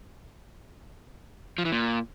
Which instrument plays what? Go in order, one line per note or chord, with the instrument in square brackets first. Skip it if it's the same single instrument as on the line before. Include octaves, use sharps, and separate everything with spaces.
[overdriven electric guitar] F3
E3
A#2